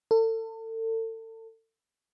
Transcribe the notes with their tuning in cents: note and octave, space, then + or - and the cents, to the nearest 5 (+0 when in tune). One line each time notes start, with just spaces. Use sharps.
A4 +35